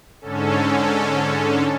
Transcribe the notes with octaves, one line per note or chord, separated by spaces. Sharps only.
G#2 D3 C#4 A4